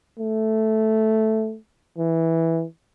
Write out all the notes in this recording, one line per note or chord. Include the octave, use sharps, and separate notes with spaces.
A3
E3